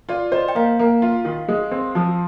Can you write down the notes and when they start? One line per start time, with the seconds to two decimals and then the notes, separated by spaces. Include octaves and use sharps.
0.09 F4 D5
0.32 C5 D#5
0.48 G5
0.55 A#3 F5
0.79 A#3
1.02 F4
1.25 D#3
1.48 G#3
1.71 C4
1.95 F3